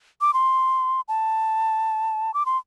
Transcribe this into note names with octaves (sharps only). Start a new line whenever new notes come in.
D6
C6
A5
D6
C6